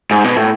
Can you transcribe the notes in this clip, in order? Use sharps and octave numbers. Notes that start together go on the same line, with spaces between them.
G#2
B2
A2